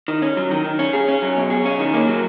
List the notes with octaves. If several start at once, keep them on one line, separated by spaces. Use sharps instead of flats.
D#3
C#4
F#3
D#3
D#3
C#4
G#4
C#4
F#3
B2
G#4
C#4
D#3
A#3
F#3